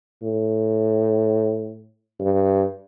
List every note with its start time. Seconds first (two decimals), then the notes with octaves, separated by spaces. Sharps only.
0.22 A2
2.19 G2